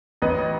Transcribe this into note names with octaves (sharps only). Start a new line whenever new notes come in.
A1 B4 D#5